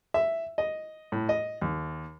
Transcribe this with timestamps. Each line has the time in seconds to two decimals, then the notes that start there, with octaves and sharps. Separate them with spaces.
0.14 E5
0.58 D#5
1.12 A2
1.29 D#5
1.61 D#2